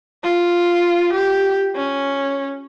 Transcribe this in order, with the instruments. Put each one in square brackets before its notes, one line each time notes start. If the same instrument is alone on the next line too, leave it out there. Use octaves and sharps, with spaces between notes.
[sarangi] F4
G4
C#4